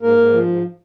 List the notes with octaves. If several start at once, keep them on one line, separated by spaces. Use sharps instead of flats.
G#2 A#3 A#4
G#2
F3
G#2